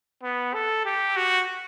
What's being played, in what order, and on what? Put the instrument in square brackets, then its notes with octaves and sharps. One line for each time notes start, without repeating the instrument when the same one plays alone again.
[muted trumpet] B3
A4
G4
F#4